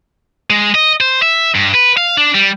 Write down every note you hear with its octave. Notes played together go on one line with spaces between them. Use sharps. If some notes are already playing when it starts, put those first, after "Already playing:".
G#3
D#5
C5
E5
G2
B4
F5
D4
G3